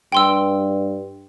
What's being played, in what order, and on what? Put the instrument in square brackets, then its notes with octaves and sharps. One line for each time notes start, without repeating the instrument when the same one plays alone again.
[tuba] G2 [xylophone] G5 C6 E6